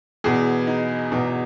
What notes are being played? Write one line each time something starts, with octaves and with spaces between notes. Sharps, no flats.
E2 B2 G#4
D#4
E2 B2 D#4